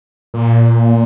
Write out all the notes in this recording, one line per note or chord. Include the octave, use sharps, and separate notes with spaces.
A#2